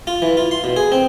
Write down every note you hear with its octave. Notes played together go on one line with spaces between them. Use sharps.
F4
E3
F4
C6
B2
G#4
C4